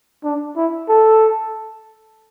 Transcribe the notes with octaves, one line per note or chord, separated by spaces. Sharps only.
D4
E4
A4